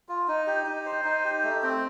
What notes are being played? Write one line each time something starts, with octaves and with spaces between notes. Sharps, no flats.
F4
D#4
G4
D#4
C5
D#4
G4
A3
C4